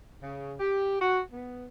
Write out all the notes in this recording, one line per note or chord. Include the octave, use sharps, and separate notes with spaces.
C#3
G4
F#4
B3